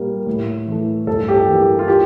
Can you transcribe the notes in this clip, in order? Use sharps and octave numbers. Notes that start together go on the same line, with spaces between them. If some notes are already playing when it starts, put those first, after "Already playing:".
Already playing: A#2 G3 A#3
A2
E3 A3
G2 A4
G4
A4
E3 G3 A#3
G4
F4
G4